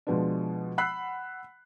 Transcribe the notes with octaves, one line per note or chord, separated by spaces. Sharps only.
B2 F3 G#3 B3 D4
F#5 B5 E6 F#6 B6 C7